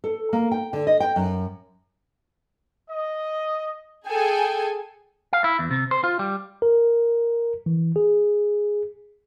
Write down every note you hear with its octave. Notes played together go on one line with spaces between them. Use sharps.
A4
A#3
G5
D3
D#5
G5
F#2
D#5
G#4 A4 G5 G#5
F5
E4
E2
C3
C5
F4
G3
A#4
E3
G#4